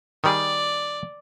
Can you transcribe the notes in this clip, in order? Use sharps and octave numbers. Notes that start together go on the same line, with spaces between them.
D#3 G3 G#4 D5